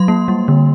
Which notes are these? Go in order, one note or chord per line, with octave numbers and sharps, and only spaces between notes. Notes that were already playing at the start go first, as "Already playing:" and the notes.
Already playing: F#3 C6
A#3
G3
D3